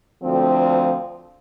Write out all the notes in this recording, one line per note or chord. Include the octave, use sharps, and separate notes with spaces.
D2 F3 C4